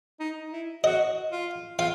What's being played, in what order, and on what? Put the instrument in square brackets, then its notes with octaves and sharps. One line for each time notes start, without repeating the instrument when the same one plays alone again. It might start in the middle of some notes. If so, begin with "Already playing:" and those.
[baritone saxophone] D#4
E4
[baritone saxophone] F#4 [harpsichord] D#5
[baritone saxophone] F4
[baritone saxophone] F4 [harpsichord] F5